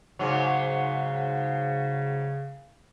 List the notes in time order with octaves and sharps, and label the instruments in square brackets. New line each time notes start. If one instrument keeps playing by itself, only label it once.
[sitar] G#2 F#3 [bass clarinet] C#3